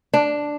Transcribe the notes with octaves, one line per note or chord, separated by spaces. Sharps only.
D4